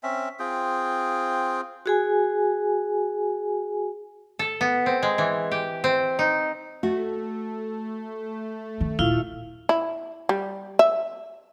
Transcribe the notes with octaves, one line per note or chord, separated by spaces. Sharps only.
C4 C#4 E5
C4 F4 G#4 G5
F#4 G#4 G#5
A4
B3
C4
G#3
E3
G4
C4
D#4
A3 F#4
D#3
D#1 E4 F4 F5
E4
G3
E5